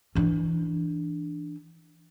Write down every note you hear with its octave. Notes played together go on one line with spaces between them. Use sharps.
E3 D4